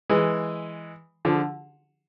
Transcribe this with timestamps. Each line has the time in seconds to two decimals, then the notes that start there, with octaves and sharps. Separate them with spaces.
0.10 E3 G#3
1.25 D3 F3